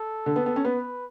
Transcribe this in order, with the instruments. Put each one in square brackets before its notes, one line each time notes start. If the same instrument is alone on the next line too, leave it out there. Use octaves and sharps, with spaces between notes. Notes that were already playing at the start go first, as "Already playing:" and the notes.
Already playing: [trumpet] A4
[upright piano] D3
B3
B3
C#4
[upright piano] B3 [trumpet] B4